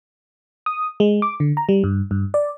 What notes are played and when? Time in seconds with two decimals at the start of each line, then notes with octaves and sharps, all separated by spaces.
0.66 D#6
1.00 G#3
1.22 D6
1.40 D3
1.57 A#5
1.69 G3
1.84 G2
2.11 G2
2.34 D5